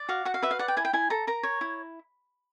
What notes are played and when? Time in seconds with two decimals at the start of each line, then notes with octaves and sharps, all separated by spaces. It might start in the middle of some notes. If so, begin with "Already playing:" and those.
Already playing: D5
0.09 F#4 F5
0.25 F#4 F#5
0.34 F5
0.42 B4 E5
0.51 F5
0.59 D5 F#5
0.68 G5
0.77 E4 G#5
0.85 G5
0.93 E4 G#5
1.10 A4 A#5
1.27 A#4 A#5
1.43 C#5
1.61 E4